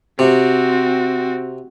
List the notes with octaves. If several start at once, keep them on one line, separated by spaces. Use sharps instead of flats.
C3 C4 F#4